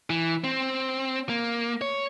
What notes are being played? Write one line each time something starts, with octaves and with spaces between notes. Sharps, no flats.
E3
C4
A#3
C#5